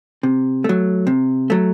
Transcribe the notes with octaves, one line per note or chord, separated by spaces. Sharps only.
C3
F#3 A3
C3
F#3 A3